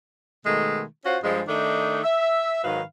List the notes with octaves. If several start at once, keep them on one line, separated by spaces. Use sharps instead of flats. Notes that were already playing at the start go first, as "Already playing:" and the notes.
B2 D#3 G#3 A3
C#4 F4 F#4 C5
G2 F3 G#3
D#3 A3 D4 D#4
E5
G#2 D#3 F#3 B4 F5